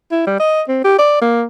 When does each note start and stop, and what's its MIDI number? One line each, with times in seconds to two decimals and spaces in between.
0.12 0.24 64
0.27 0.37 55
0.40 0.62 75
0.69 0.80 60
0.84 0.96 67
0.99 1.17 74
1.22 1.44 58